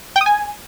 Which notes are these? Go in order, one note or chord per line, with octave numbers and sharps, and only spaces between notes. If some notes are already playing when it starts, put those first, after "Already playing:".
G5
D#6
G#5